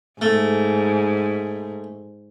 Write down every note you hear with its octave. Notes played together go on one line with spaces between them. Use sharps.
G#2 A3